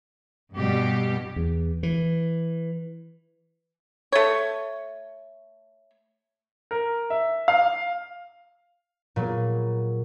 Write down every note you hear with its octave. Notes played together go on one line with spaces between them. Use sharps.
G2 B2 G3 G4
E2
E3
A3 C#5
A#4
E5
F5
A#2 F#3 B3 G#4